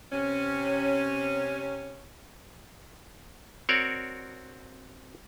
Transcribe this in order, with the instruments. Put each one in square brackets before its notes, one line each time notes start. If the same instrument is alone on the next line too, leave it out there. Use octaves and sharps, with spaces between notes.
[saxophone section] C3 C#4
[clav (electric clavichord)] C4 F#4 A#4 C#5 D5